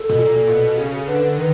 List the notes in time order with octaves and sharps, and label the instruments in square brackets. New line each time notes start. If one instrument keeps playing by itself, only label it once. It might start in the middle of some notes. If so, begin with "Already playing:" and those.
Already playing: [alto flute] A4
[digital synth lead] B2
A#2
B2
C#3
[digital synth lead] D3 [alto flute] B4
[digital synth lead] D#3 [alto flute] B4